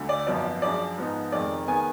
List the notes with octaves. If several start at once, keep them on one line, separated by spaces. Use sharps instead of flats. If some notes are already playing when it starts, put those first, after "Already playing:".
Already playing: D2 D3
D5
G#1 F#2 F3 B3 D5
F#2 F3 G#3 D4 D5
G#2 F3 B3 D#4
F1 F2 D#3 G#3 D5
D#3 G#3 B3 G#5